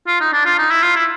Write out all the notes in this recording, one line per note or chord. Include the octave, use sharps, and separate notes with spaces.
F4
D#4
D4
F4
D#4
E4
F4
E4